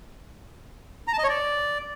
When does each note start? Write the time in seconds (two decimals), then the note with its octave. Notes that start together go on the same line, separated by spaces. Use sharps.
1.08 A#5
1.13 A5
1.18 D#5
1.24 C#5
1.29 D5